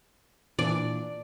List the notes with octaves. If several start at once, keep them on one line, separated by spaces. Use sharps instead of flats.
A#2 E3 D4 D5